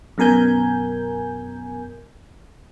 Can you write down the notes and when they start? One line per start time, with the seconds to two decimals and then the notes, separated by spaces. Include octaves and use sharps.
0.18 F#2 B2 A#4 G#5 G6